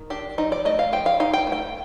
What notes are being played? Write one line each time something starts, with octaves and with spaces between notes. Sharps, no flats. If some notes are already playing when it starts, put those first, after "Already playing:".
Already playing: D#3
D4 G4
F3 D#4
D5
A3 D#5
F5
F3 G5
F5
D#4 F5
G5
A3
G5